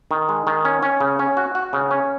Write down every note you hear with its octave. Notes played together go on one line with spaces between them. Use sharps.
D#3
G#3
D#3
C#4
C#4
C#3
C#4
F#4
F#4
C#3
C#4